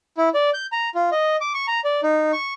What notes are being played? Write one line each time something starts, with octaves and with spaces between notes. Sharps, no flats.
E4
D5
G6
A#5
F4
D#5
D6
C#6
A#5
D5
D#4
C#6